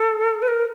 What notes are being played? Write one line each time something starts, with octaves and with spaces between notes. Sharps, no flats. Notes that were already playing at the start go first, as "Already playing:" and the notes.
Already playing: A4
B4
A#4